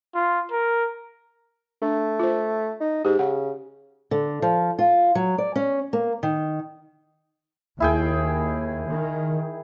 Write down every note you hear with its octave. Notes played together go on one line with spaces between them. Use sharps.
F4
A#4
A3 D4
F4 C5
D#4
G#2 G4
C#3 F#5
D3
F3
F4
F#3
D5
C#4
A#3
D#3
D#2 E4 G#4 G5
D#3